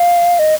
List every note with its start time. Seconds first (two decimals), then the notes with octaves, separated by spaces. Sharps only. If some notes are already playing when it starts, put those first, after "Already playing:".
Already playing: F5
0.39 D#5